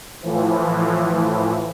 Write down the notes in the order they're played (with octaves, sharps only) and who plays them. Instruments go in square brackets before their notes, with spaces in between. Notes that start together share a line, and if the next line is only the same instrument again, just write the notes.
[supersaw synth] A2 E3 F3